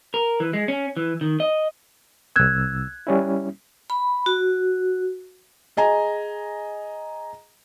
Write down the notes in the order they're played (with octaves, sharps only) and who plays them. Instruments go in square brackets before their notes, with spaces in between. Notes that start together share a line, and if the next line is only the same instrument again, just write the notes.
[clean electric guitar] A#4
E3
G#3
C#4
E3
D#3
D#5
[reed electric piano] C2 E6 [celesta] F#6 G#6
[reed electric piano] G3 C#4 E4
[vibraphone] B5
F#4
[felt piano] G#4 D#5 G#5 A#5